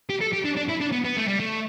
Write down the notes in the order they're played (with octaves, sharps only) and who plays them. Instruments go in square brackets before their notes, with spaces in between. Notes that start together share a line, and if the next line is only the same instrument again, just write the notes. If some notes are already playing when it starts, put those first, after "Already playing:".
[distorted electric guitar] G4
A4
G4
D4
D4
E4
D4
B3
B3
A3
G3
A3